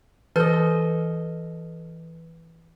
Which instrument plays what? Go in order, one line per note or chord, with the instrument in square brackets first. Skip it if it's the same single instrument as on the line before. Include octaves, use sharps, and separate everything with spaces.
[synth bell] E3 B4 F6 [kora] A4 D#5